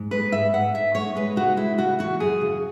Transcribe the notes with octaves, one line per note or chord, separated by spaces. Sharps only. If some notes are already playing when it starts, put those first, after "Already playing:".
Already playing: G#2
G#3 B4
G#2 E5
G#2 F#5
G#2 E5
G#3 C#5
G#3 B4
C#3 F#4
G#3 E4
C#3 F#4
E3 F#4
F#2 G#4
C#3